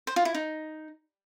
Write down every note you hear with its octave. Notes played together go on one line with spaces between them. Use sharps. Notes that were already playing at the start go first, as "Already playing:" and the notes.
C5
F4
E4
D#4